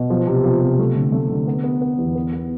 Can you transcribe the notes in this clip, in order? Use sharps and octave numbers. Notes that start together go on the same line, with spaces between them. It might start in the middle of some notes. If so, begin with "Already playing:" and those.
Already playing: B2
F3
C3
F3
C3
A3
D3
A3
D3
B3
B3
B3
E2
B3
B3